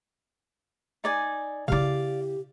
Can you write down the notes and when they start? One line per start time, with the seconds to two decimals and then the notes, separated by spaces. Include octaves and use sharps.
1.04 D#4 D5 G#5
1.68 C#3 E4 G4 D5 F5